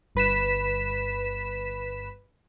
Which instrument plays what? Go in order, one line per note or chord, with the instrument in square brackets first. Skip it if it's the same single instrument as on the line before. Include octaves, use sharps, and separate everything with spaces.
[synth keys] G1 B4 B6 E7